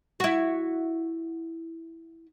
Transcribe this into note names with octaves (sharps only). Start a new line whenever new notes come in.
E4 F#4